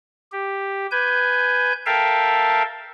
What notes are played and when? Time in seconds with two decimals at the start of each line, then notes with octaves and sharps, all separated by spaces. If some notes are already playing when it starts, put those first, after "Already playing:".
0.32 G4
0.91 B4 G#5 G6
1.86 A4 A#4 E5 F5 G5 A5